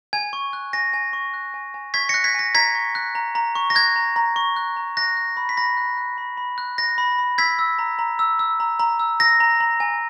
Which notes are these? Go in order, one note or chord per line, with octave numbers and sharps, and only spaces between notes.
G#5 G#6
C#6
F#6
G#5 A#6
G#5
C#6
F#6
G#5
G#5
C#6 G#6 B6
F#6 A#6 C#7
G#6 B6
G#5 A#6
A#5 G#6 B6
C#6
F#6
A#5
A#5
C#6
A#6
F#6 G#6
A#5
A#5
C#6
F#6
A#5
F#6 A#6
F#6
B5
B6
B5 A#6
F#6
F#6
B5
B5
F#6
F#6 A#6
B5
B5
E6 G#6 B6
E6
A#5
A#5
E6
E6
A#5
A#5
E6
E6 A#6
A#5
A#5
G#5